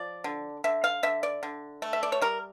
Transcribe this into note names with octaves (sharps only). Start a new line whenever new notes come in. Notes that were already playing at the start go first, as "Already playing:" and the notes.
Already playing: F3 D5
D3
D3 E5
F5
D3 E5
D5
D3
A3
E5
D5
C#5
G3 A#4